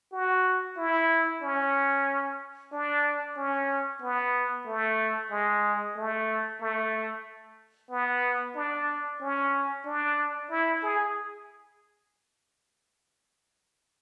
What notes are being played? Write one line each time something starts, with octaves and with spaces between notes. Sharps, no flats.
F#4
E4
C#4
D4
C#4
B3
A3
G#3
A3
A3
B3
D4
C#4
D4
E4
G#4